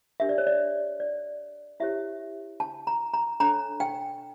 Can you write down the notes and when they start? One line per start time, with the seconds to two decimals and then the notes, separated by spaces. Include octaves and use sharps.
0.20 D4 G4 A#4 E5
0.29 D5
0.38 C#5
0.47 D5
1.00 D5
1.80 E4 G4 C#5 E5
2.60 A5
2.87 A#5
3.14 A#5
3.40 D4 A4 C#5 A#5
3.80 G5